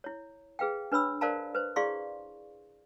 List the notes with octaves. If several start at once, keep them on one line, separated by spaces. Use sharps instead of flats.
E4 C#5
G#4 B4 F5 G5
D4 B4 C#5 B5 E6
A#4 C5 D5 F5 A5 A#5
B4 C5
E4 G#4 D5 F5 C6 C#6